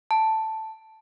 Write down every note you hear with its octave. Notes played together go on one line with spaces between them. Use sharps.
A5